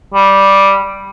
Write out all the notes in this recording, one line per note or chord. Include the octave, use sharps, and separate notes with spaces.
G3